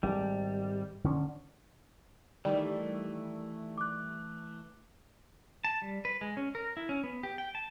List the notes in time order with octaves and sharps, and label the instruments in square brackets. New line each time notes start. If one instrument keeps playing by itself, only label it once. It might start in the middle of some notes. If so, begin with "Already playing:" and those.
[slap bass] G#1 [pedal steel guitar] G3
[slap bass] D3 C#4
[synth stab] D#3 G3 [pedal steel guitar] E3 A3
[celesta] D6 F#6
[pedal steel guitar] A5
G3
B4
G#3
C#4
A#4
E4
C#4
B3
G4
G5
A5